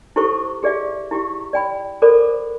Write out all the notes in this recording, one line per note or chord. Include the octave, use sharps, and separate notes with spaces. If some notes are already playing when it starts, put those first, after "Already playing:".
E4 G4 A4 C5 C#6 D6
G4 G#4 D5 E5 F5
E4 G4 F5 C#6
D5 G5 B5
A4 A#4 C5 D5 B5 D6